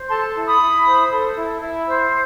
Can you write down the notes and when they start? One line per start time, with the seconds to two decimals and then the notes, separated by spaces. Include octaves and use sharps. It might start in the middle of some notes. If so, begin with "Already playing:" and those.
Already playing: C5
0.09 A4 A5 C6
0.34 E4
0.47 B5 D#6
0.59 E4
0.86 C5
1.10 A4
1.36 E4
1.61 E4
1.86 C5